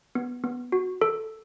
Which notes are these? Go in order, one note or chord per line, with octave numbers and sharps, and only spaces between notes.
B3
B3
F#4
A4